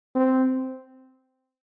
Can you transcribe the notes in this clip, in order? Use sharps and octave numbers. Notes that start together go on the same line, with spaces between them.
C4